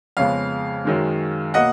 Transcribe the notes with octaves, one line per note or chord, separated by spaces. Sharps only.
F2 C#3 G#3 B3 C#5 F5
F#2 D#3 G#3
B2 A#3 D#5 F#5